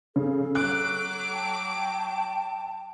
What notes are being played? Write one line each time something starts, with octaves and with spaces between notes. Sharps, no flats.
C#3 A4
F#3 D6 F#6
G5 A5